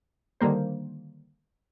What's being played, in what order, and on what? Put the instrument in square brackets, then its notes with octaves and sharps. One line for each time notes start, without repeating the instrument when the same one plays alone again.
[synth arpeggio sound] D3 D#3 G3 A#3 C5